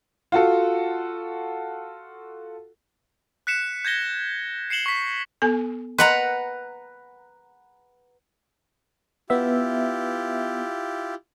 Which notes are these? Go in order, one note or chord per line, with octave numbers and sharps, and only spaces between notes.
F4 F#4 A4
F#6 B6 C#7 E7
G6 G#6 A#6 G7
C7 C#7 E7 F#7 G7
C#6 B6
B3 A4 G#5
B4 D#5 F#5 A#5 C6
B3 E4 F4 G4 E5